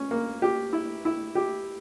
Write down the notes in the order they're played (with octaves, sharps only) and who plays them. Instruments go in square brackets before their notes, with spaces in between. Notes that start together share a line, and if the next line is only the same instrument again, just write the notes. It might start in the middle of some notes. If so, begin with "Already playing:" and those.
Already playing: [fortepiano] C#4
A#3
G4
E4
E4
G4